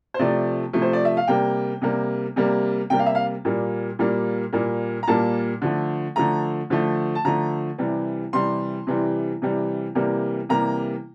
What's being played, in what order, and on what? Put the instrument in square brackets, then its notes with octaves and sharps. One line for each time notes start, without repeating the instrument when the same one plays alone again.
[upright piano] C5
C3 F3 A3 D5
C3 F3 A3
C5
D5
E5
F5
C3 G3 A#3 G5
C3 G3 A#3
C3 G3 A#3
C3 G3 A#3 G5
F5
E5
F5
A#2 G3 A#3
A#2 G3 A#3
A#2 G3 A#3
A#5
A#2 G3 A#3 A5
D3 F3 A3
D3 F3 A3 A#5
D3 F3 A3
A5
D3 F3 A3 A#5
C3 E3 G3
C3 E3 G3 C6
C3 E3 G3
C3 E3 G3
C3 E3 G3 A#3
C3 E3 G3 A#3 A#5